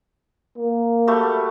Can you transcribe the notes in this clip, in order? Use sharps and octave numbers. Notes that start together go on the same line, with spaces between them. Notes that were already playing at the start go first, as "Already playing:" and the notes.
A#3
G3 A3 F#4